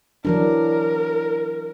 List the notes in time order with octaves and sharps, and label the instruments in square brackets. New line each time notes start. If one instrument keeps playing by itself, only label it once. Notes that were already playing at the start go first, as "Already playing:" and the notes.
[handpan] E3 F#3 D4 [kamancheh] A#4